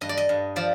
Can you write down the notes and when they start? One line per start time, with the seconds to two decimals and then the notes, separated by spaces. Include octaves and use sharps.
0.01 G2 D#5
0.09 D5
0.17 D#5
0.29 G2
0.56 F3 D5